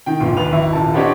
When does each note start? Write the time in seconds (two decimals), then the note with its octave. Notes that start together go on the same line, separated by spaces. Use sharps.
0.06 D#3 G5
0.20 G1 A#2 F4
0.37 D#2 B4 F7
0.52 G#1 E4
0.73 D#1 A5
0.94 B3 C4 D4 G4 C#5 D#5